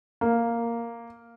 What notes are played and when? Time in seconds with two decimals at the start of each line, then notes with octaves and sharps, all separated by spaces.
0.21 A#3